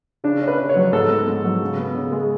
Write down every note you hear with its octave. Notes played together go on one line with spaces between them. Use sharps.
C#3 D4
C#4
B4
C#3
C#5
F#3
G#2 A4
B3
G#2
F#3
C#3
B3
C#3
G#3